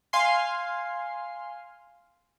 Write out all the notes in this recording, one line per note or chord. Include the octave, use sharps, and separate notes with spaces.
F5 G#5 C6 C7